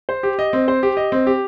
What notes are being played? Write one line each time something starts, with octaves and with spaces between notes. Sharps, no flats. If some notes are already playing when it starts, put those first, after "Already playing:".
C5
G4
D#5
C4
C5
G4
D#5
C4
G4